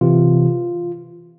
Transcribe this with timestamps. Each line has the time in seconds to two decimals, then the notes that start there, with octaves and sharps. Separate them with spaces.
0.01 C3 E3 F4